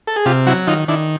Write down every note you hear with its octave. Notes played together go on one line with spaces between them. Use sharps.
A4
G#4
C3 F4 G4
F#3 E4 F#4
D#3 D#4 F4
D#3 D4 E4